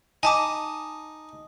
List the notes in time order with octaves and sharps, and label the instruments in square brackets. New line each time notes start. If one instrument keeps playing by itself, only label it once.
[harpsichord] D#4 [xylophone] G#5 A5 D6